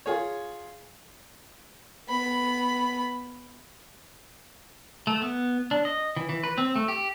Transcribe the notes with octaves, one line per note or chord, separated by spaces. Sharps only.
F4 G#4 C#5
B3 B5
A3
B3
D4
D#5
E3
E3
B4
C4
A3
G4